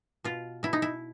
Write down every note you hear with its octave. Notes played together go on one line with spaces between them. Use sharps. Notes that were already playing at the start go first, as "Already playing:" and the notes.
B2 F4
B2 E4
D#4
E4